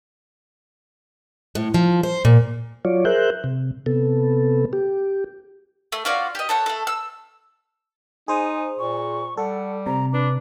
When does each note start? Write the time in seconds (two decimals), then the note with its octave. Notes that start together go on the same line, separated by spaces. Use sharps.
1.55 A2
1.74 F3
2.03 C5
2.25 A#2
2.85 F#3 F4 C#5 D5
3.05 G#4 A#4 C5 E5 F#6 G6
3.44 C3
3.86 C3 B3 A4
4.73 G4
5.92 A3
6.05 C#4 F4 F#4 D5
6.35 G4 D#5
6.49 A4 C#5 F#5
6.66 A3 A4
6.87 E6
8.28 D#4 G#4 C5 G#5
8.79 A#2 C#6
9.37 G3 A4 F#5
9.86 C3 A#5
10.13 D4 B4